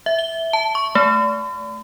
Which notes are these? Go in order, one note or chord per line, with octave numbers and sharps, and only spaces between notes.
E5
G7
A5
C#6
A3